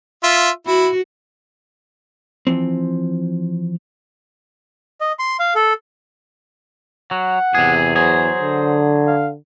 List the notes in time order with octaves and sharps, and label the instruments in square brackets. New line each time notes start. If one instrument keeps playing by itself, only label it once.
[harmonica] F4 E5
[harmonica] E4 [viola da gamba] F#4
[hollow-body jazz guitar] E3 F3 C4
[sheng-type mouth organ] D#5
C6
F5
A4
[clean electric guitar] F#3 [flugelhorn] F#5
[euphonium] E2 [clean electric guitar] C3 G#4
[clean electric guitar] F#3 G#4 [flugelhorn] C5
[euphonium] D3
[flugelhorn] F5